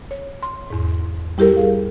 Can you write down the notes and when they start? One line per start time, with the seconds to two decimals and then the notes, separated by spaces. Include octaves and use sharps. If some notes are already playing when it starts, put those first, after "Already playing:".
0.11 C#5
0.43 C6
0.70 E2 G#2
1.38 G3 E4 G4 A4 A#4
1.57 G#4 F5